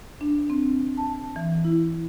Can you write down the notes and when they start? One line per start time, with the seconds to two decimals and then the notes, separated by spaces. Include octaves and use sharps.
0.21 D4
0.50 C4
0.98 A5
1.36 E3
1.65 E4